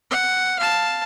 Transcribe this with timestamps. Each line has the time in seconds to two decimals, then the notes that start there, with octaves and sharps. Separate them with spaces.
0.11 F#5
0.59 F5 A5